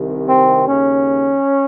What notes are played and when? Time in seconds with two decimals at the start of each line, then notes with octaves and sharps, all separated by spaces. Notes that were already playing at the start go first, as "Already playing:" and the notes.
Already playing: C2 C3 D#3
0.27 C4
0.66 D#2 C#3 C#4